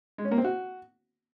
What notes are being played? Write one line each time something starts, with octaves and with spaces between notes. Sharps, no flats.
G#3
C#4
A#3
C4
F#4